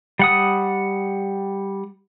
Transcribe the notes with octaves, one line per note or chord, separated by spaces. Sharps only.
G3 F#5 D#6